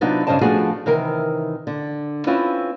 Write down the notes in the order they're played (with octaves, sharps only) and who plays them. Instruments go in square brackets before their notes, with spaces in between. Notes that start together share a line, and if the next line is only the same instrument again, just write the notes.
[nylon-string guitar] C3 F#3 B3 D4 D#4 F4
G2 C#3 C#4 C5 D#5 A5
F3 A3 B3 D4 F#4 G#4
C3 D#3 E3 A#4
D3
C4 C#4 E4 F4 B4